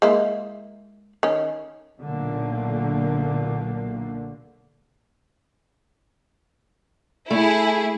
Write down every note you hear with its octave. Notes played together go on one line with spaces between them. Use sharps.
G#3 A#3 E4
D#3 C#4
B1 A#2 D3 A3 A#3
A3 E4 G#4